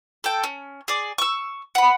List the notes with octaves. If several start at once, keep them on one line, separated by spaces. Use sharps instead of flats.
A4 G5
C#4
G#4 D5
C#6 E6
F#5 B5